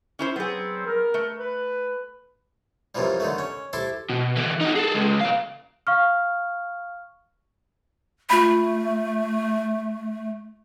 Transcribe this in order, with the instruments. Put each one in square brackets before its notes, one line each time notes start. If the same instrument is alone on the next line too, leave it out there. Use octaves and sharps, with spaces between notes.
[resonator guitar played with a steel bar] C#4 E4 C5
[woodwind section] F#3 C4 [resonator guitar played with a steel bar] B3 G#4
[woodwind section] A#4
[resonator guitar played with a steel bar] A3
[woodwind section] B4
[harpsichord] F#2 C3 E3 F3 G3
D3 D#3 A3
C#4
E4 G4 A4 C5
[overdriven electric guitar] B2
D3 E3
D#4 F#4
G#4 A4
C#2 G#3
B2 F5
[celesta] F5 C#6 F6
[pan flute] A3 [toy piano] F4 B5